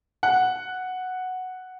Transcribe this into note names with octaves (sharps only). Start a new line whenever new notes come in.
F#5